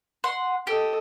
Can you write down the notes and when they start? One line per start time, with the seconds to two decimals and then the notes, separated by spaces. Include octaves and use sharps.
0.24 F#5 C6
0.67 G4 A4 D#5